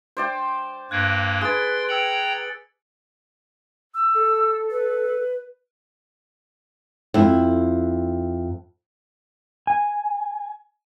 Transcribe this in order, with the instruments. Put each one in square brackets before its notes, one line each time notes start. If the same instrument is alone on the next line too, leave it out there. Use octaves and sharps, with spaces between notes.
[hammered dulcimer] C5 D5 G5
[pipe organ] G2 A#3 [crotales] F#6 G#6 D7
[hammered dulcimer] G#4 B4 [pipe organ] C6 [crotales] A6 D7
[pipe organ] G5 A#5 [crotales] E6 C#7 F#7
[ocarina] E6
[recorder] A4
[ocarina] B4
[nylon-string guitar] F2 E4
[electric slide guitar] G#5